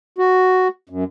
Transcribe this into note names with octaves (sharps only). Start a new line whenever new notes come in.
F#4
F#2